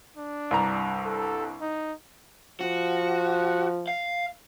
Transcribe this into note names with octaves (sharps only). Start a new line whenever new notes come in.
D4
C2 G2 A#5
A4
D#4
F3 F#4
F5